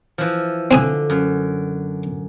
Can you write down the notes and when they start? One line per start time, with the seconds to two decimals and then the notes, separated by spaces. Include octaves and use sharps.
0.18 E3 F3
0.71 D3 C4 G#5 D#6
1.10 F#2